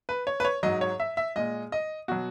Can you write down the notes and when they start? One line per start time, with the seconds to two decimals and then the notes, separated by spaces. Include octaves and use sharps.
0.09 B4
0.27 C#5
0.40 B4
0.45 C#5
0.63 G#2 F#3 D#5
0.81 C#5
1.00 E5
1.17 E5
1.36 A#2 G#3 D#5
1.72 D#5
2.08 B2 F#3 F#4